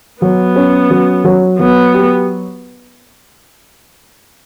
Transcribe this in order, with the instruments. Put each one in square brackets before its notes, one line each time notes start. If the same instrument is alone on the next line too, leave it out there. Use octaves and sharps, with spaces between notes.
[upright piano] F#3 [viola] B3
[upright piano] C#4
F#3
F#3
[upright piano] F#3 [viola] B3
[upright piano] G4